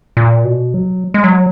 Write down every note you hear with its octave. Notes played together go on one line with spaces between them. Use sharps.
A#2
B2
F#3
G#3
F#3